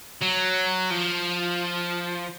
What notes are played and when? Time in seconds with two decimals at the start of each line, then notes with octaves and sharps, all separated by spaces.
0.22 F#3
0.90 F3